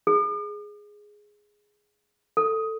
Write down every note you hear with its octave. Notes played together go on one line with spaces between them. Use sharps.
G#4
A4